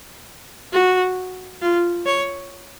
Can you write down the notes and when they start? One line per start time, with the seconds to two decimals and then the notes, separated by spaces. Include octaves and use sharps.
0.72 F#4
1.61 F4
2.06 C#5